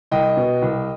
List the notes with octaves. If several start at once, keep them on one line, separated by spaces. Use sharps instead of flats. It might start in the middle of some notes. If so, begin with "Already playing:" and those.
C2 D#5 G5
B2
C2